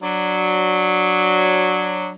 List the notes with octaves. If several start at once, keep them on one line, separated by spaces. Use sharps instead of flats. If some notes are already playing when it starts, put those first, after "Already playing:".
F#3 D4